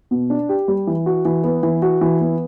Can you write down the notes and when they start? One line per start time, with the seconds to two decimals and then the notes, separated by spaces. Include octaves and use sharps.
0.11 B2
0.30 D4
0.49 G4
0.68 G3
0.87 E3
1.06 F#4
1.25 E3
1.44 B3
1.63 E3
1.82 F#4
2.01 E3
2.20 B3